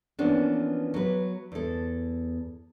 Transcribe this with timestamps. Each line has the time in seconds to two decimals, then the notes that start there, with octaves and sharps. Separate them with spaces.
0.19 E3 F3 A#3 B3 C#4 D4
0.94 F#3 B4
1.52 E2 A4